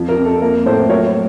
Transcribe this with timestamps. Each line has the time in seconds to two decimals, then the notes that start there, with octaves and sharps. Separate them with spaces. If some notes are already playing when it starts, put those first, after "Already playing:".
Already playing: F2 F3
0.09 A#4
0.17 F2
0.25 A4
0.41 A#3 A#4
0.66 A2 A4 C5
0.90 F#3 A#4 C#5